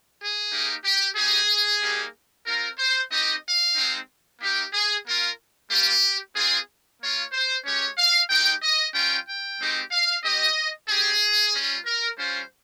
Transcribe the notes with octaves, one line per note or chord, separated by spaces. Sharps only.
G#4
A#3 D#4 G4
G4
G#3 D#4 G4 G#4
G3 A#3 D#4 G4
C4 F4 A#4
C5
C4 D#4 G4 D#5
F5
G#3 C4 D#4
A#3 D#4 G4
G#4
A#3 F4 A#4
G3 A#3 F4 G4
C4 F4 G#4
A#3 F4 C#5
C5
G#3 C#4 G4 C#5
F5
G#3 D#4 G4 G5
D#5
G3 C#4 F4 G5
G5
G#3 C4 D#4 G4
F5
C4 G4 D#5
C4 G4 G#4
G3 C#4 F4
A#4
G3 C#4 F4 C5